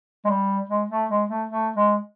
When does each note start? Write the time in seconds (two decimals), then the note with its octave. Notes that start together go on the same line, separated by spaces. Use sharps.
0.25 G#3
0.29 G3
0.69 G#3
0.90 A3
1.09 G#3
1.29 A3
1.49 A3
1.76 G#3